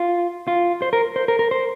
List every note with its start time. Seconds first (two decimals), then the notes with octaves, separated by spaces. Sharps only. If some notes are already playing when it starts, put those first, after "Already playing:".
Already playing: F4
0.47 F4
0.82 C5
0.93 A#4
1.16 C5
1.28 A#4
1.39 A#4
1.51 C5